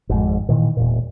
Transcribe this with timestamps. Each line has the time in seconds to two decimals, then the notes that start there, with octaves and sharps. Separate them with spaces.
0.09 G#1 F2 G#2
0.49 A#2 D#3 E3
0.77 E1 A#2